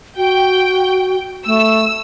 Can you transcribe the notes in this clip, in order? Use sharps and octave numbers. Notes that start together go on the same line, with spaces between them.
F#4 G5
A3 E6